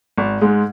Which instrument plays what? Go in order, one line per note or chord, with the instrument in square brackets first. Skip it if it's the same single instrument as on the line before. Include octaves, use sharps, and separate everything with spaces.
[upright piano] G#1
G#2 G#3